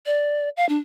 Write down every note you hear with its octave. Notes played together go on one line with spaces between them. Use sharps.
D5
F5
D4